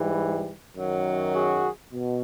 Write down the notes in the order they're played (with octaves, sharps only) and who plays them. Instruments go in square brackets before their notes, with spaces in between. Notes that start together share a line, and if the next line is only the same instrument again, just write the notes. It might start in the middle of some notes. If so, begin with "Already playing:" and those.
Already playing: [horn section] G#2 E3 G3
F#2 D#3 F#3
F#4 G#4
B2